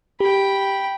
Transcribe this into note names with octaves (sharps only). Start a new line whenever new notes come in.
G4 G5 B5